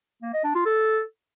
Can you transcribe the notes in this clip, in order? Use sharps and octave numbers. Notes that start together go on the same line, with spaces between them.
A#3
D#5
D4
F4
A4